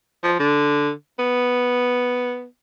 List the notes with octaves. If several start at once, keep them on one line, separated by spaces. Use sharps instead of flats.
F3
D3
B3